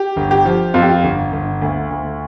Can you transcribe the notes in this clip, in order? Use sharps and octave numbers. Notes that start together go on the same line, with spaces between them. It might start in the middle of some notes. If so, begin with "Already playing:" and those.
Already playing: G4
G1
G4
F3
F2 F4
G4
F4
G1
G1
D2
D2